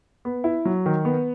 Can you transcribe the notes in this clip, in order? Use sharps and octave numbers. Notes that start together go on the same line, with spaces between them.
B3
E4
F#3
D#3
B3